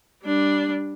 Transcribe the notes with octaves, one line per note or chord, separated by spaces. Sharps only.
G3 D4